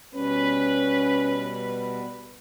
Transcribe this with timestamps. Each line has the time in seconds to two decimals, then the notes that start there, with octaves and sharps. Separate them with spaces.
0.15 B2 G3 B3 C#4 B4